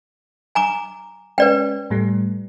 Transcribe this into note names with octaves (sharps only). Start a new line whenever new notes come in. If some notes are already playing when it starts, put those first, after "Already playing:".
G#5 A#5 D6
G#3 C#4 B4 D5 G5
A2 G3 A3